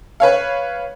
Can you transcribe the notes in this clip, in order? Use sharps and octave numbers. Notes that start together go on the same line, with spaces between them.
B4 C#5 F5